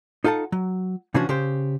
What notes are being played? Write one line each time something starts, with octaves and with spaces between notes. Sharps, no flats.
D#4 F4 A4 F#5 A5
F#3
C3 E3 F3 C#4 D4 F#4
C#3 G4 C5